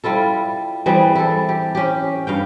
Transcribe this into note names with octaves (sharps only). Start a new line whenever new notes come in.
G3 E4 F4 A4
E3 G3 C4 G#4
E4 A4
G4
C#4 G4
G2 F5 G5